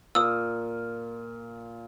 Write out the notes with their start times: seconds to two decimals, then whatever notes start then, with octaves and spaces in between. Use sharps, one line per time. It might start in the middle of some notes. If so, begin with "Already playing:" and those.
0.15 A#2 D#6 E6